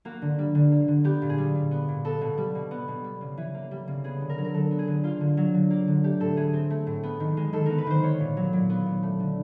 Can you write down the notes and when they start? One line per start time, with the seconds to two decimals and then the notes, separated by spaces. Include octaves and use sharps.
0.05 A#3 F#4
0.22 D3
0.38 G3
0.55 D3
0.71 A#3
0.88 D3
1.04 B3 G4
1.22 A#2
1.29 G#4
1.38 G3
1.55 A#2
1.71 B3
1.88 A#2
2.04 B3 A4
2.21 B2
2.38 G3
2.55 B2
2.71 B3
2.88 B2
3.04 G3
3.21 C#3
3.38 E3
3.54 A#3
3.71 G3
3.88 C#3
4.04 B3 G#4
4.21 D3
4.29 A#4
4.38 F#3
4.45 A#4
4.54 D3 A4
4.71 B3
4.79 G#4
4.87 D3
5.03 A#3 F4
5.20 D3
5.37 F#3
5.54 D3
5.70 A#3
5.88 D3
6.04 A3 G4
6.20 A2 A4
6.37 E3 G#4
6.53 C4
6.70 A3
6.87 A2
7.03 B3
7.20 D#3
7.37 G#3
7.53 D#3 A4
7.66 B3 A#4
7.78 B4
7.87 D#3 C5
8.03 B3 C#5
8.20 A#2
8.37 F#3
8.53 A#2
8.70 B3
8.86 A#2
9.03 A3
9.20 D3